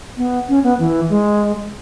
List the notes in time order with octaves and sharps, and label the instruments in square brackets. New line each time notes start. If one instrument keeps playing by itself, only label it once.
[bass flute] B3
C#4
B3
E3
G#3